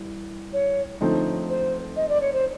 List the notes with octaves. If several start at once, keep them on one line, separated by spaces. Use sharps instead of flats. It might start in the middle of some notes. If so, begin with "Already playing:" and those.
Already playing: E3 G3
C#5
D3 F3 A3 C4 D#4
C5
D#5
D5
C#5
C5